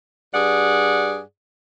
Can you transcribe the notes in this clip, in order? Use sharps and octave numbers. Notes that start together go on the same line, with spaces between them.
G2 G#4 D5 F#5